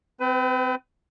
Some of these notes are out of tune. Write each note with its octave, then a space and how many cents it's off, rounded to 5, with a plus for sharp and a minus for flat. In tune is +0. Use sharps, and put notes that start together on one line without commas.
C4 -25 B4 +30